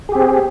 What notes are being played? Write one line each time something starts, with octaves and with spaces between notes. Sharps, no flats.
C4 G4 G#4